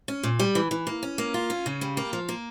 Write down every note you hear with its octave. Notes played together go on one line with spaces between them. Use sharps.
C#4
A#2
G3
E3
E3
A#3
C#4
A#3
F4
C#4
C#3
G3
A#3
F3
A#3